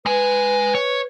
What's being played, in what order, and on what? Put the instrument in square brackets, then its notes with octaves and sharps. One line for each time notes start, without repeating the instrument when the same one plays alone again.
[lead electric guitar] G#3 G#5 [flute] B4
[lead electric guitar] C#5